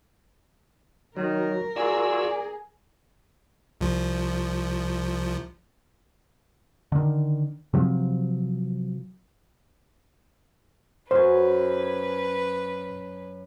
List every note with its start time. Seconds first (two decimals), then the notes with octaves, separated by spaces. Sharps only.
1.17 D#3 F#3 A#4
1.76 F4 F#4 G#4 D5 E6
3.81 C2 F3
6.92 D3 D#3
7.73 C3 F3 F#3
11.11 F#2 B4 C5 G#5